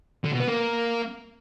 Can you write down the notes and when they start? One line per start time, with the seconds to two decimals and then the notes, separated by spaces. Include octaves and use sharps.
0.24 D3
0.32 B2
0.40 B3
0.48 A#3